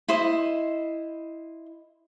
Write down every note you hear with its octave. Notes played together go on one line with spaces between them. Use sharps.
E4 C5 D#5